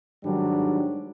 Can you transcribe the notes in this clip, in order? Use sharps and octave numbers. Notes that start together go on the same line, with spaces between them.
G#2 D#3 F#3 G3 D4